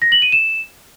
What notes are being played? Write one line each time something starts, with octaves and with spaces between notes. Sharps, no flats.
A#6
F#7
D#7
E7